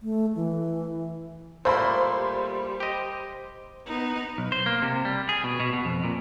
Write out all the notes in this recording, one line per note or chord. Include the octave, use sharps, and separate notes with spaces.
A3
E3
A#2 G3 A3 A#3 C5 B5 C6
G4 D#5
B3 D#4
B1
C5
A#3
C3
G3
G#4
B2
B2
B2
F2
A#2